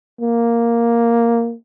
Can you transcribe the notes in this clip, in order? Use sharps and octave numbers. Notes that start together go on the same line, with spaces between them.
A#3